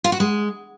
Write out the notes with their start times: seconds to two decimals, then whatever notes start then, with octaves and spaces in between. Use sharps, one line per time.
0.04 F4
0.12 F#4
0.20 G#3